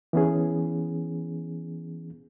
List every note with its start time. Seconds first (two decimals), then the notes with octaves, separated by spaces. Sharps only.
0.13 E3 B3 C#4 G#4